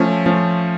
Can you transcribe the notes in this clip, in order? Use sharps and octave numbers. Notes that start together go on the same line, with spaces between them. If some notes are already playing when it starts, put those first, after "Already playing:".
Already playing: F3 A3 C#4
F3 A3 C#4